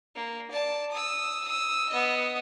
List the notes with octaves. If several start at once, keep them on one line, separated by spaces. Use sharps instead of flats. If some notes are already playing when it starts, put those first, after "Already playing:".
A#3
D5 A5
D#6 E6
D#6 E6
B3 D#5